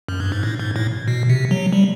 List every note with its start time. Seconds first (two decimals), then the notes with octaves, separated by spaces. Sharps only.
0.09 F#2
0.20 G2
0.32 G#2
0.43 A2
0.60 G#2
0.76 A2
1.08 B2
1.29 C3
1.51 F#3
1.73 G3